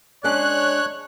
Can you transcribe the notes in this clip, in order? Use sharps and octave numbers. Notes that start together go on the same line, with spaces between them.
G#3 C#4 D4 C#5 F#6